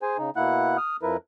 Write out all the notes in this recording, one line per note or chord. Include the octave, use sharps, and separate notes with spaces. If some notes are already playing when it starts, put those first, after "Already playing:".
G#4 C5 G#5
C#3 D#4
B2 A#3 E4 F#5 F#6
D#6 F6
F2 F3 E4 A#4 B4